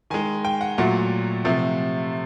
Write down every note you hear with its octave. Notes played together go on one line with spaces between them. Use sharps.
D#3 G#3 G#5
G5
F#5
A#2 F#3 A3 F#5
C3 F3 A3